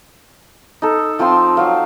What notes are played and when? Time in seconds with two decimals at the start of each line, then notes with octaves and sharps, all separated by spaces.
0.82 D#4 A4
1.19 F3 C4 A5 C6
1.57 F#3 F5